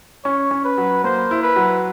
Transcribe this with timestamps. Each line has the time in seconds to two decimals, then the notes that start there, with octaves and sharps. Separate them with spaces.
0.24 C#4 C#5
0.51 C#4
0.65 B4
0.78 F#3
1.04 A#3 C5
1.31 E4
1.43 B4
1.56 F#3